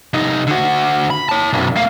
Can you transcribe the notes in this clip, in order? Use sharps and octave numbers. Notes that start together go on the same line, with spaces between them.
C2 D#4
D3 F#4
B5
C#5 A5
B1 F#2
A3 F5